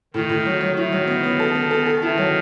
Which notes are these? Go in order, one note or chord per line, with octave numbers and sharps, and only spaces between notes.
A2 D#3
A2
F#3
F#3
D#3 E4
F#3
B3
B3
A4
B3
A4
A4
D#3 E4
F#3